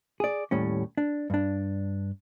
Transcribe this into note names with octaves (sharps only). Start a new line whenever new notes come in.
G#4 D5
D#2 A2 G3 C#4
D4
G2 D4